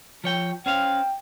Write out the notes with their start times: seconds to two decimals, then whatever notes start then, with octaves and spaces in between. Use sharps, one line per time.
0.24 F3 C#5 G5
0.66 C#4 C5 F5 G5